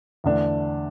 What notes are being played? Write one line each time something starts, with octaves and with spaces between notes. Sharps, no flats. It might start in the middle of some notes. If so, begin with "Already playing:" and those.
E2 D3 A3 D4